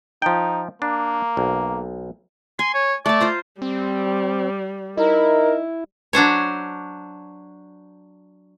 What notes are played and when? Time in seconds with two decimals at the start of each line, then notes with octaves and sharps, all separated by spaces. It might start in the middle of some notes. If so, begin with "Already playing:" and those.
0.22 F3 D#4 G5
0.82 A#3 D4
1.37 B1
2.59 G#5 C6
2.74 C#5
3.06 A3 D5 A5
3.20 F4 C5 A#5
3.62 G3 C4
4.97 D#4 E4 A#4
6.13 F#3 D4 C5 C#5